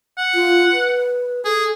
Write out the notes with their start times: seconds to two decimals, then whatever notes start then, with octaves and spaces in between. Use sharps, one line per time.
0.18 F#5
0.34 F4
0.72 B4
1.45 G#4 A4